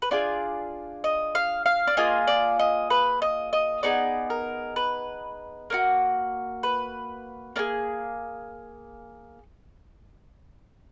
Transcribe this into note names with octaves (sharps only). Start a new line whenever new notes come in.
B4
D4 F4 G#4 D5
D#5
F5
F5
D5
A#3 F4 G#4 D#5
D5
D#5
B4
D#5
D#5
B3 D#4 G#4 D5
A#4
B4
A#3 D#4 F#4
B4
A#3 D4 G#4